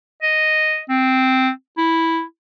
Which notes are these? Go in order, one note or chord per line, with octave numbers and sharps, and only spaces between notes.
D#5
C4
E4